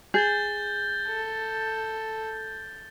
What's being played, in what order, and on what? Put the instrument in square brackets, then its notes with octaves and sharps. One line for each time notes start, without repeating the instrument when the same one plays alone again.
[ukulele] G#4 [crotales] G6 A6 G7
[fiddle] A4